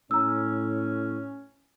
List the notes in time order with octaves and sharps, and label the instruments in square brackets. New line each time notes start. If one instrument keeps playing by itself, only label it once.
[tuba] A2 [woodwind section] C#4 [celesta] A#5 E6